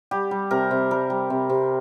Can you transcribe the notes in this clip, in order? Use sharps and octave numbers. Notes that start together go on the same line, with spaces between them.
G3 G4
G3
C3 A#4
C3
G3 A#4
G3
C3
C3